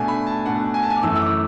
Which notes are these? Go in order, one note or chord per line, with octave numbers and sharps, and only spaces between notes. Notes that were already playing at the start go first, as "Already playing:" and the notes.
Already playing: B2 A3 D4 G#5
B5
A5
B2 A3 D4 F#5
G#5
A5
G#5
D6
F#2 E3 A3 E6
E6
D6